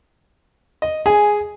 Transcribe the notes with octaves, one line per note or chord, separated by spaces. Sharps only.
D#5
G#4 G#5